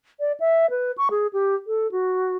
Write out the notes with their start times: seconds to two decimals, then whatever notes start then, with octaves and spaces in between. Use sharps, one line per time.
0.20 D5
0.40 E5
0.70 B4
0.98 C#6
1.11 G#4
1.33 G4
1.67 A4
1.92 F#4